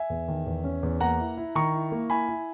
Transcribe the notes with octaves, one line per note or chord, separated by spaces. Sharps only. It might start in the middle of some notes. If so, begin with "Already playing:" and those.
Already playing: E5 G#5
E2
D#3
E2
C#4
E2
A#3 F#5 A#5
E4
E4
D#3 A#5 C#6
E4
A#3
E4 G#5 B5
E4